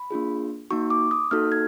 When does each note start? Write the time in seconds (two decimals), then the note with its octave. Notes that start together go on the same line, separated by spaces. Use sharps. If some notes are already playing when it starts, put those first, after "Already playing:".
Already playing: B5
0.11 A#3 D4 F4 G#4
0.71 A#3 D#4 F#4 C#6
0.90 D6
1.11 D#6
1.31 A#3 D#4 F#4 A4 F6
1.52 G#6